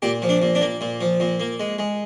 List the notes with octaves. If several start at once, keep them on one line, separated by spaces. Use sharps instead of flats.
A#2 G4
F3
D4
A#2
D4
A#3
A#2
F3
A#2
A#3
G#3
G#3